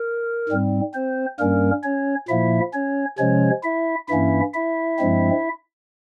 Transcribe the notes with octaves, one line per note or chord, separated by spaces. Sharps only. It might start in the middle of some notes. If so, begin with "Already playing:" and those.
Already playing: A#4
G#2 G3 C4
C4 C5
G2 G3 A#3 C#4 A#4
C#4 C#5
A#2 F3 A#3 E4 E5
C#4 C#5
C3 F3 G#3 C#4 C#5
E4 E5
G2 E3 A#3 C#4 E4 E5
E4 E5
G2 F3 G#3 C4